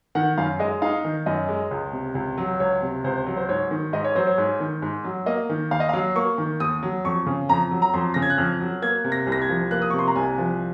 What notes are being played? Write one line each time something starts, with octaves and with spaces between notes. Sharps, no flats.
D#3 F#5
F#2 F5
G#3 D#5
D#4 F5
D#3
F#2 D#5
G#3
C#2
C3
C#2
F#3
C#2 C#5
C3
C#2 C5
F#3
C5
G#2 C#5
D#3
G#2 D#5
C#5
F#3 C5
C#5
G#2
D#3
G#2
F#3
A#3 D#5
D#3
D#2 F5
D#5
F5
F#3
A#3 C#6
D#3
D#2 D#6
F#3
F2 C#6
C#3
F2 A#5
F#3
A#5
F2 C6
C#3 A#6
G#6
F#6
F2 F6
F#3
A#3 G#6
C3
A#6
C2
A#6
G#6
F3
A#3 F#6
D#6
C3 C#6
C6
A#5
C2 G#5
F3